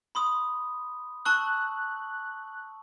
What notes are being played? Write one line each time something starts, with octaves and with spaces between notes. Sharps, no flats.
B5 C6 D#6
A5 C#6 E6 F#6